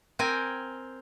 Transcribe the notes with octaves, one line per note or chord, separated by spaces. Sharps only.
C4 A#4 G5 G#5